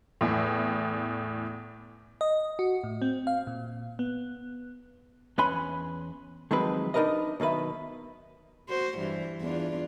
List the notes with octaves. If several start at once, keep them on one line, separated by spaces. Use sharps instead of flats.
E2 A2
D#5
F#4
A2
C4
F5
A#2
B3
E2 C#4 B4 G#5 B5 C6
D#3 F3 F#3 G#3 C4 B4
D4 D#4 F#4 A#4 B4 D#5
B1 B2 D#3 B4 E5
F#4 C5
G2 E3
E2 D4 F4